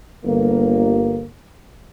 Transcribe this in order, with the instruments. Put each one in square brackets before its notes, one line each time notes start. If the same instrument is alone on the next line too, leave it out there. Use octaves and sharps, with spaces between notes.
[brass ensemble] G1 A#3